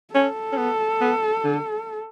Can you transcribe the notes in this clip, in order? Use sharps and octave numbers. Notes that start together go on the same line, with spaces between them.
C#4 A4
C#4
B3
B3
D3